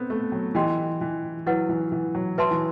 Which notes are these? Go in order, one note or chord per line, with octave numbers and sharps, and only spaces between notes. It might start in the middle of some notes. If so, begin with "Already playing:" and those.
Already playing: B3 C4 A4
A3
F#3
E3 G4 D#5 G5 C6
E3
F#3 E4 B4 F#5
E3
E3
F#3
F#3 B4 E5 A5 C6
E3